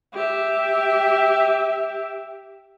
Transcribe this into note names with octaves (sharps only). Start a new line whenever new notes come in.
G4 E5